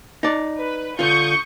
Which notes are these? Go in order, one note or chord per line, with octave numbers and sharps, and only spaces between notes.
D#4 D5
B4
D3 F4 C#6 D#6 G6